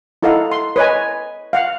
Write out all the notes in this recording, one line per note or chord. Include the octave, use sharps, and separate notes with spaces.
D#4 E4 A4 D#5 F5 F#5
C6
B4 C#5 D#5 G#5
F5 F#5